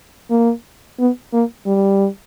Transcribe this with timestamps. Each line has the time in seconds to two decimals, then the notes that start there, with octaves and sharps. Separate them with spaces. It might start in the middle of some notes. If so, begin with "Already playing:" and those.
0.31 A#3
0.99 B3
1.33 A#3
1.66 G3